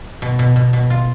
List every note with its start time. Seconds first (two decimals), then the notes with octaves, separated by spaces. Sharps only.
0.22 B2
0.39 B2
0.56 B2
0.73 B2
0.90 F4